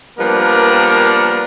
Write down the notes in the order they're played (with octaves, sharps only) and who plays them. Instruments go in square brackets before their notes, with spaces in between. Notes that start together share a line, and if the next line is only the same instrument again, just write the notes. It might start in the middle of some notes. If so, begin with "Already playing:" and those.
[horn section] F3 G3 A#3 B3 D4 A#4